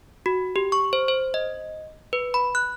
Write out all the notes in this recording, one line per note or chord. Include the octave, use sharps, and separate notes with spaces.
F#4
G4
C#6
C5
C5
D#5
B4
B5
F#6